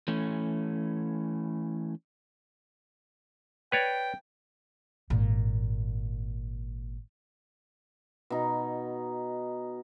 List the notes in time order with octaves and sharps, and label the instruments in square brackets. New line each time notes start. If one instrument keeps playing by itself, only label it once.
[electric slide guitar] E3 A3 C#4
[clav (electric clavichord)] B4 C#5 D5 [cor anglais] G5
[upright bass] G#1 A#2
[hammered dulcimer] B2 D#4